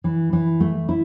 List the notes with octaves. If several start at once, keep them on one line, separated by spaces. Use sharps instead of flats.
E3
E3
A3
E4